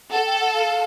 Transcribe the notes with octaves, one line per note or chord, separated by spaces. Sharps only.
A4 F#5
G5
F#5
F5